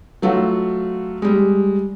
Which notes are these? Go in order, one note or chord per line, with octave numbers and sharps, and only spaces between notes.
F#3 A3 F4 F#4
G3 G#3